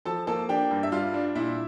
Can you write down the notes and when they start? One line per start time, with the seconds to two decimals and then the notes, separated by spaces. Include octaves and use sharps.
0.05 F3 A4 A5
0.27 A#3 A4 A5
0.49 D4 G4 G5
0.71 G2
0.83 E5
0.92 G3 F4 F5
1.14 D4
1.35 A#2 E4 E5